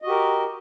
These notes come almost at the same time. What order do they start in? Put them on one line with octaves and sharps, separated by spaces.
D#5 F#4 G4 A#4